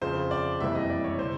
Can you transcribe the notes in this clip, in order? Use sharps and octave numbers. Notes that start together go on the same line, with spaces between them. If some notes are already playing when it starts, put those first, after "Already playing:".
F2 C#3 F3 C5
D5
F#1 F2 C3 E3 G3 E5
D#5
D5
C#5
C3 C5